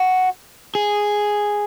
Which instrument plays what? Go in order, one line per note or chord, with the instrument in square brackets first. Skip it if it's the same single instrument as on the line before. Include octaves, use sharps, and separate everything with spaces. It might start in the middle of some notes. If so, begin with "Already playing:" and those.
Already playing: [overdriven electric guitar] F#4
G#4